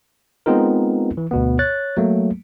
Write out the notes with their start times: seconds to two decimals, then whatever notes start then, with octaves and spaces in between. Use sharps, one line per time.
0.46 G#3 B3 C4 D#4 F4 A#4
1.17 E3
1.31 D2 B2 B3
1.59 C#5 F#6 A6
1.97 F#3 A3 A#3